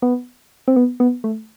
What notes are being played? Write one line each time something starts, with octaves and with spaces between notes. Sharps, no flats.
B3
C4
B3
B3
A3